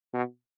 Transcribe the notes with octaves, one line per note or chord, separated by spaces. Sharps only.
B2